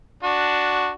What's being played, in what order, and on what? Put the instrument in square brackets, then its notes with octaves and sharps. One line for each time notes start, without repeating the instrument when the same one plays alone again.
[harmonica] D4 F#4